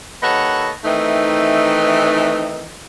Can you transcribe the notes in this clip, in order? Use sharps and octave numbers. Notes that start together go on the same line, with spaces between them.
D#2 A4 B4 C#5 D#5 F#5
D#3 E3 A3 C4 D#4